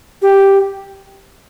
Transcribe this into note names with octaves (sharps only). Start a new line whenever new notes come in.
G4